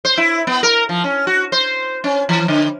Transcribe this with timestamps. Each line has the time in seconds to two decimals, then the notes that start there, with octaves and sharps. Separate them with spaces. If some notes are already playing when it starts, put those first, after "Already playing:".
0.05 C5
0.17 E4
0.47 B3
0.63 A#4
0.89 F3
1.04 C#4
1.27 F#4
1.52 C5
2.04 C#4
2.29 E3
2.48 D3